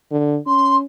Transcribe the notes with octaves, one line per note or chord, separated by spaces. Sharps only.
D3
C#4 C6